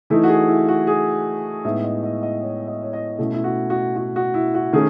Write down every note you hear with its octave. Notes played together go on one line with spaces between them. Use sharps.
E3 A3 D#4 E4
F#4
G#4
E4
F#4
G#4
A2 G#3 B3 D#4 E5
D#5
D#5
D#5
C#5
D#5
C#5
D#5
B2 A3 C#4 E4
E4
F#4
F#4
F#4
F#4
E4
F#4
D#3 A3 C#4 G#4